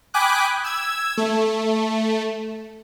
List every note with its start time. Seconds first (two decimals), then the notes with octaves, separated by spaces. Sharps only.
0.14 G5 G#5 B5 D6 D#6 F#6
0.64 E6 G#6
1.17 A3